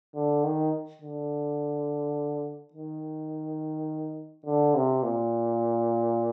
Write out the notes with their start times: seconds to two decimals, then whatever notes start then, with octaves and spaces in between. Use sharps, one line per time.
0.15 D3
0.44 D#3
1.01 D3
2.73 D#3
4.46 D3
4.75 C3
5.03 A#2